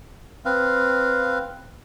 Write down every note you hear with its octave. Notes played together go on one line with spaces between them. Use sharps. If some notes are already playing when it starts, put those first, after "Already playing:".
C4 B4 F5